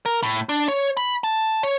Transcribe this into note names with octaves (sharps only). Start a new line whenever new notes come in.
A#4
A2
D4
C#5
B5
A5
C#5